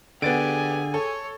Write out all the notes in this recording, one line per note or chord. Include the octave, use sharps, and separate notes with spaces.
D3 B3 G4 G#4 G#5 A6 D7
A4 C#5